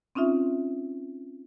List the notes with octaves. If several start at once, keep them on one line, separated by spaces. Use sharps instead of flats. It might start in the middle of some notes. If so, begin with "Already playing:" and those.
C4 C#4 D#4 F4 E5